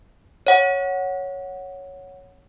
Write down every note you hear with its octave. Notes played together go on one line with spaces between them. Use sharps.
C#5 F#5